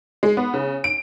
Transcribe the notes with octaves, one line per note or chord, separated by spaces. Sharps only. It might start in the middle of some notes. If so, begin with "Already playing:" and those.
G#3
B3
C#3
D7